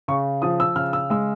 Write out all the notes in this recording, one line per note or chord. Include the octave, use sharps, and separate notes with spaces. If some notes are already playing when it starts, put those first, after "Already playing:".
C#3 C#6
F3 D#6
E6
C#3 F6
E6
G#3 E6